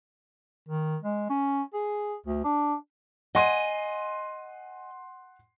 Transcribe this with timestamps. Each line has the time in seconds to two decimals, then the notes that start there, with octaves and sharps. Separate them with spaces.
0.69 D#3
1.02 G#3
1.30 C#4
1.74 G#4
2.26 D2
2.44 D4
3.35 D#5 F#5 G#5 C6 D#7